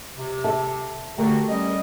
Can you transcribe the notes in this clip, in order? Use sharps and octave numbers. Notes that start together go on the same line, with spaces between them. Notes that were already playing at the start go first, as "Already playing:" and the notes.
C3
A4 E5
D3 A3 F#4 G4 A#4
G3 C#4 D#5